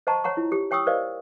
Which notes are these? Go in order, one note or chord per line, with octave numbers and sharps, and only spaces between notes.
C5 D#5 F#5 A5 A#5 C#6
C#5 F#5 A#5 C#6
E4 F4
G4
C#5 G5 C#6 D#6 E6
A#4 C5 D5 D#5 F5